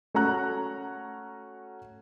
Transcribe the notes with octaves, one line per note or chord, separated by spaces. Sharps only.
A3 C#4 F#4 A#5 F#6